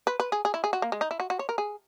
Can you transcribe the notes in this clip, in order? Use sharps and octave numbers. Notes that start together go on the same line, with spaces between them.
B4
B4
G#4
G#4
E4
G#4
F#4
A#3
G#3
D#4
E4
F#4
F#4
C#5
A#4
G#4